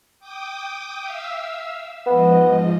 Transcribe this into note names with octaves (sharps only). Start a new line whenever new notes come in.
G5 D6 D#6
E5 F5 E6
G#2 F3 B3 D#5